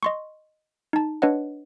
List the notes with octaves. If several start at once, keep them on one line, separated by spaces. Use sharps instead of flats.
D#5 C6 C#6
D#4 A5
D4 B4 C#5 D#5 F#5